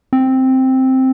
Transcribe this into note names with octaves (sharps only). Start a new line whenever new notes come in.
C4